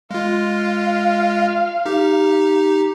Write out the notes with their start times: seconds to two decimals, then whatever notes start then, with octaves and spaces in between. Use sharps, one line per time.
0.11 G#3 F4 F5
1.86 D#4 G4